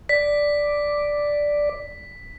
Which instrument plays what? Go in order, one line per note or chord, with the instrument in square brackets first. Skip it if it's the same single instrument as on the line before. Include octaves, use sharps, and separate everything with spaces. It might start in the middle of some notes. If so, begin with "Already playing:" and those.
[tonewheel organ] D5 [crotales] B6